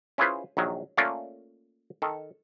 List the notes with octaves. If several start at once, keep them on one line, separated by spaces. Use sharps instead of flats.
C#4 E4 F4 G#4 B4 C5
A#1 D#3 F#3
A3 A#3 C#4 F4 D5 F#5
D#3 A4